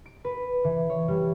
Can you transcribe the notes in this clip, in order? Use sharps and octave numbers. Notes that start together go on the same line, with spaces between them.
D7
B4
E3
C#5
G3